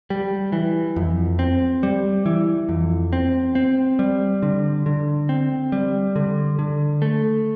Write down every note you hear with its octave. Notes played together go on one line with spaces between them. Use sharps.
G3
E3
F2
C4
G3
E3
F2
C4
C4
G3
D3
D3
C4
G3
D3
D3
A3